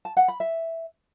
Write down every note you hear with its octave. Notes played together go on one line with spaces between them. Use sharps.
A5
F#5
B5
E5